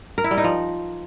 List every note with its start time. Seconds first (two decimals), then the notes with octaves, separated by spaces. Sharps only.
0.18 A#4
0.24 E4
0.31 G3
0.38 D#4
0.44 F3